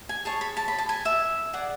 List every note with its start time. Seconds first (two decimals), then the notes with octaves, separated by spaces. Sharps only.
0.09 G#5
0.25 G#4 C#5 A5
0.41 B5
0.57 A5
0.68 B5
0.78 A5
0.89 G#5
1.05 E5
1.53 G#4 D5 F#5